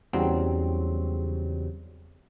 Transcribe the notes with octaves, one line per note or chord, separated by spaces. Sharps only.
E2 C#3 F#3 G3 C4